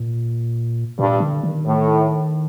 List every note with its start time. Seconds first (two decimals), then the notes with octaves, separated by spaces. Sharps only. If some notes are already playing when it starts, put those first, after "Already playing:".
Already playing: A#2
0.98 G2 A#2
1.20 D3
1.43 D#3
1.66 A2